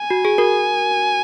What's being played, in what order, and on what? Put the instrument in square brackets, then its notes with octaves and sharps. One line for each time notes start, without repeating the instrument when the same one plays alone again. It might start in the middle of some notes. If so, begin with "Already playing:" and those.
Already playing: [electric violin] G#5
[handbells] F#4
G#4
F#4 A#4